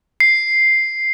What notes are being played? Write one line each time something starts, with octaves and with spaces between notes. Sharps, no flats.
C7